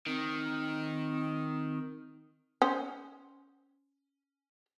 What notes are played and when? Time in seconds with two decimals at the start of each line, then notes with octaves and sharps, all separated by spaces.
0.07 D#3 C4
2.62 C#4 C5